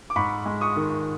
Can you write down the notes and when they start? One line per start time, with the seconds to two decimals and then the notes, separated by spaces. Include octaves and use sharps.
0.10 D6
0.16 G#2 B5 C#6
0.46 G#3
0.61 C#6 D#6
0.76 D#3